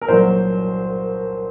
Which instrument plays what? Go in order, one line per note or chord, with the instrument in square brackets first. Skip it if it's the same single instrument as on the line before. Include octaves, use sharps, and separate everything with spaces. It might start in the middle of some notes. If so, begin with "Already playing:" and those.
[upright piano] A#4
C2 A#2 F#3 C5